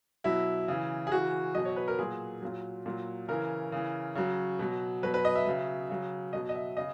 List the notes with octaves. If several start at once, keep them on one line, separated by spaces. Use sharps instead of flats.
B2 F#3 E4
C#3 E3
G#4
C#3 E3 F#4
B2 F#3 D#5
C#5
B4
A#4
A#2 F#3 G#4
A#2 F#3
A#2 F#3
C#3 E3 A#4
C#3 E3
C#3 F#3
B2 F#3
B2 F#3 B4
B4
D#5
E5
C#3 F#3
C#3 F#3
B2 F#3 D#5
D#5
E5
C#3 D#5